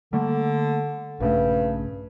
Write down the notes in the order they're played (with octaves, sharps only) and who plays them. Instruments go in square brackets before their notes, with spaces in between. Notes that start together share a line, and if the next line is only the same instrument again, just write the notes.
[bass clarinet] D3 [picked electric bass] G3 A3 A#3
[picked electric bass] A#1 C#3 A3 [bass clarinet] G2